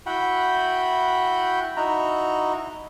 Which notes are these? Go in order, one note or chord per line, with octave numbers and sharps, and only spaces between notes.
E4 F#4 F#5 G5 B5
D#4 E4 F#4 A#5